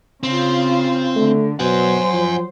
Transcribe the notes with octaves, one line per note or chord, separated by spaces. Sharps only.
C#3 C4 F4
D3 A3
B2 F#3 C5 F#5 G#5
F3